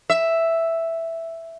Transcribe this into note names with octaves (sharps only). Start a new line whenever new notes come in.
E5